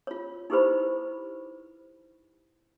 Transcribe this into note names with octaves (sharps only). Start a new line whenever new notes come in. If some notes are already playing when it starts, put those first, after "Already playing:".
F4 C#5
D#4 E4 G4 B4 C5 B5